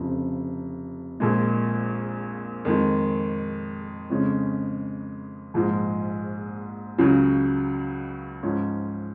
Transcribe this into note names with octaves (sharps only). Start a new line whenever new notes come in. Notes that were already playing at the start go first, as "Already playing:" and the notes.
Already playing: F1 F2 C#3 F3
A#1 A#2 G#3
F2 D#3 G#3
F2 C#3 G#3 C#4
A#1 G#2 F3 G#3
C#2 C#3 F#3
G#2 F3 G#3 C#4